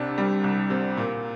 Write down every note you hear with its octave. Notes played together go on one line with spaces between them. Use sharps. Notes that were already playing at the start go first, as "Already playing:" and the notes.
Already playing: C2 C3 D4
G3
C2
C3
A#2